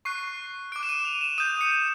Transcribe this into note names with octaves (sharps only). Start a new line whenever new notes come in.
C#6 F#6 C7
D6 F#6 D7
E7
D#7
F7
E7
D#6 G6 D#7
C#7
C#7